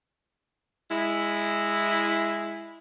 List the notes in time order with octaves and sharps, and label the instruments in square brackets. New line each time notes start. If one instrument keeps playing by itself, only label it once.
[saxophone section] G#3 E4